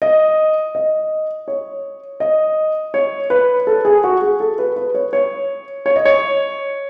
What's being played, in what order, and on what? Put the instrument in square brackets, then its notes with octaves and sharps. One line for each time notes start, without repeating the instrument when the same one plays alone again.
[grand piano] D#5
D#5
C#5
D#5
C#5
B4
A4
G#4
F#4
G#4
A4
B4
B4
C#5
C#5
C#5
D#5
C#5